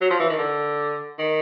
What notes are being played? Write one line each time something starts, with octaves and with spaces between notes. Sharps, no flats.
F#3
F3
E3
D#3
D3
D#3